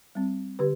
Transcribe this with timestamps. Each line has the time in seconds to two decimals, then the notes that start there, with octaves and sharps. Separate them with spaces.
0.15 G3 C4
0.59 D3 G4 B4